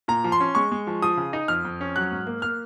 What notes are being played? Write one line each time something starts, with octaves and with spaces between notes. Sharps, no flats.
A#2 A#5
F3
C6
C#4
G#3 C#6
G#3
F3
F3 D#6
C#3
D#4
F2 F6
F2
C#4
F#3 F#6
G#2
A#3
A#3 F6